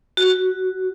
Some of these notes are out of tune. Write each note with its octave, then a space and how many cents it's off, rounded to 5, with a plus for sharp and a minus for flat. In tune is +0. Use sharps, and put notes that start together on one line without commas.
F#4 +0